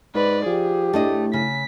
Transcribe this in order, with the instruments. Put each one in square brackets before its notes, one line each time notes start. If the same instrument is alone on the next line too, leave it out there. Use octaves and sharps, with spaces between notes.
[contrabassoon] G#2 [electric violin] B4 D5
[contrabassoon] F3 [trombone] G4 [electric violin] G#4
[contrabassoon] A2 [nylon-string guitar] A3 D4 D#5
[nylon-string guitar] C#3 [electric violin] B6